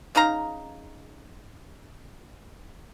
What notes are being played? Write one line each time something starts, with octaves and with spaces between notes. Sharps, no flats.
C#3 D#4 F5 A#5